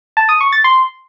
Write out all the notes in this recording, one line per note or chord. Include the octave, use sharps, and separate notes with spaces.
A5
D#6
C#6
A6
C6